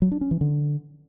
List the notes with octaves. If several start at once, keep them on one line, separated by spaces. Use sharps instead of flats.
F#3
D4
C#4
E3
D3